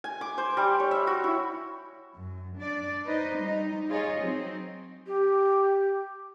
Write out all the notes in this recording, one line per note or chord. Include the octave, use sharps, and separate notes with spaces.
G#5
D6
C5
G3
C#5
E5
F#4
E4
F#2
D4 D5
D#4 B4 C5 D#5
G3 D#4
F4 G#4 C#5 D#5
F#3 C4 D#4
G4